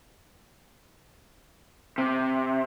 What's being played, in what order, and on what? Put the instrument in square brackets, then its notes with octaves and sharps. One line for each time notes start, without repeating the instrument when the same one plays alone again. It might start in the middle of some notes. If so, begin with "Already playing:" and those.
[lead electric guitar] C3